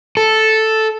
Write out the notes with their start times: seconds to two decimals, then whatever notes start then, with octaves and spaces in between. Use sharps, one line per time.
0.17 A4